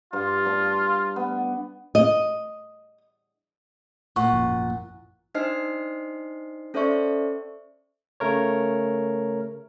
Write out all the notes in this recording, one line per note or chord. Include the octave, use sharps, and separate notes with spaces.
G2 F4
G2 D4
B3
D#5
A#2 F#5 C#6
G#1 F#2 F3
D4 D#4 C5 D#5 F6 C7
C#4 A4 C5 D5 E5 C#6
C#3 A3 A#4 C#5